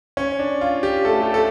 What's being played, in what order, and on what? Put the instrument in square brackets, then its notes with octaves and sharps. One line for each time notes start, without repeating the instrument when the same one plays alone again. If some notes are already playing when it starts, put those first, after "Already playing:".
[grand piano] C#4
D4
F4
G4
[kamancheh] A3 [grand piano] A4
[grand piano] G4
A4